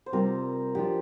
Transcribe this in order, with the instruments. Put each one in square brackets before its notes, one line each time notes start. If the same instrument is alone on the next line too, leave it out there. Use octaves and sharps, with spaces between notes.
[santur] C5
[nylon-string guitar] C3 G3 C4 F4 [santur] A#4
[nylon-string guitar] F3 D4 F4 [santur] G4